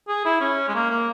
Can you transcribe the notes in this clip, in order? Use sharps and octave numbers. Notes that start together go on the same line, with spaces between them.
G#4
E4
C#4
G#3
A#3
A#3